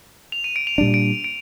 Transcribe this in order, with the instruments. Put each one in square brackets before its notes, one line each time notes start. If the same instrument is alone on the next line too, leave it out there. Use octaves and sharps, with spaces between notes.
[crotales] F7
D#7
D7
F7
[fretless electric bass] A#2 G3 D4 [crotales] D7
[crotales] D7
D7